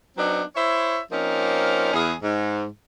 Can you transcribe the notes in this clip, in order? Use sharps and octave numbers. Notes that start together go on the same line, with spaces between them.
F#3 B3 C4 D4 D#4
E4 C5 C#5 E5
F3 A#3 C4 C#4 D#4
E2 G#4
G#2